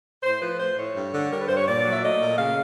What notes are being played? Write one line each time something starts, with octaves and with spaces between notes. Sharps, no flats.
A2 C5
F3 B4
A3 C5
A2 C#5
G2
D3
G3 A#4
B4
G2 C5
C#5
A#2 D5
F#3
E5
A3 D#5
A#2
C#3 F5